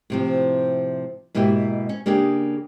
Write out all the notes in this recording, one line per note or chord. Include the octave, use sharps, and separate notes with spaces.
A2 C3 F3
G#2 B2 A#3 E4 G4
C#4
C#3 A#3 D4 G4 G#4